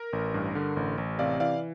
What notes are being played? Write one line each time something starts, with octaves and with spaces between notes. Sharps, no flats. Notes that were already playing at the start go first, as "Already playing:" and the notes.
Already playing: A#4
A1
G2
D3
A1
A1
C3 D5 F5
E3 D5 F5